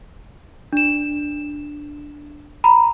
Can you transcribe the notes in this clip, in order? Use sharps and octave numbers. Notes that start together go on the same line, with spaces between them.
D4 E7
A#5 B5